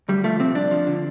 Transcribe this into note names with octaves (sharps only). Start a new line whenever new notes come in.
D2 G3
F3 A3
C3 C4
F2 D4
F3
D3